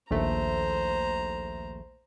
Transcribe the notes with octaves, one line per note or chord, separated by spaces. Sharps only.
A#1 D#2 A3 C5 A#5